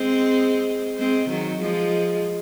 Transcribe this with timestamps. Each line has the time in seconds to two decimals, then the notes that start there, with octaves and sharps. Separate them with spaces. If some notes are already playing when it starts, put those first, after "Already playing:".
Already playing: G#3 C4
0.99 G#3 C4
1.30 D#3 F#3
1.61 F3 G#3